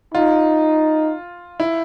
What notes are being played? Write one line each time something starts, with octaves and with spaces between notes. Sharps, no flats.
D#4 F4
E4